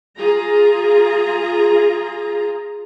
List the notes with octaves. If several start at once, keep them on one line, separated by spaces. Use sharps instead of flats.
F4 G#4 A#5